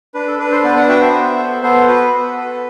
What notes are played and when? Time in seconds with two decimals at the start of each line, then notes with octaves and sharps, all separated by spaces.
0.14 D4 B4
0.27 A4
0.39 D4 B4
0.51 A4 C5
0.64 B3 B4 D5
0.77 D5 F#5
0.88 F#4 E5 G5
1.01 C5 E5
1.13 B3
1.38 A4
1.63 B3 A4 C5
1.88 F#4 B4
2.12 B3
2.37 A4